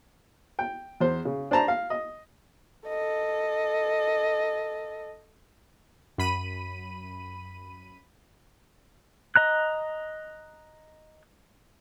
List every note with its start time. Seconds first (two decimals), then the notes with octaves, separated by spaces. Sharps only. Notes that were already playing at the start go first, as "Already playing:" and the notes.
0.59 G5
1.00 E2 C5
1.25 C#3
1.51 D4 C5 A5 A#5
1.68 F5
1.90 D#5
2.88 A4 D#5
6.18 F#2 B5 D#7
9.36 D#5 A#5 F#6